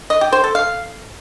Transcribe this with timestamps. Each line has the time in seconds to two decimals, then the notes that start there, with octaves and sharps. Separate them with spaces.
0.10 D#5
0.21 G4
0.32 C5
0.44 A4
0.55 F5